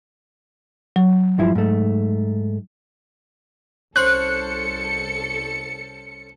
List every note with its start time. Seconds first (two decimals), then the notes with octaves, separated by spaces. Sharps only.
0.96 F#3
1.38 G2 F3 E4
1.55 G#2 A3
3.96 C2 C#4 A4 C5 F#6 C#7